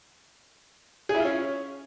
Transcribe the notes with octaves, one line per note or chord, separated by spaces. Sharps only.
G#4
E4
F4
C#4